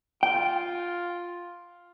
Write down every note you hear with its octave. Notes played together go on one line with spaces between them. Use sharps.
F4 G5